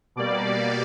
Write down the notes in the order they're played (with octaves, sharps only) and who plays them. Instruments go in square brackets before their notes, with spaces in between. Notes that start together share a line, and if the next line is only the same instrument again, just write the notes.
[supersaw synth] B2 G3 A#3 D5